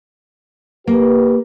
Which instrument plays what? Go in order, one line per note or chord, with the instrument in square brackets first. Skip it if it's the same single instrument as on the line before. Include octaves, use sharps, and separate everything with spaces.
[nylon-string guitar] A#3 [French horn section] G4 B4